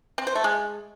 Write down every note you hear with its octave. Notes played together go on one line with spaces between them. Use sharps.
C4
C5
A3
G#3